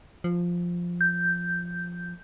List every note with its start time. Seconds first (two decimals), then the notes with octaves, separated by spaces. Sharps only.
0.24 F3
1.01 G6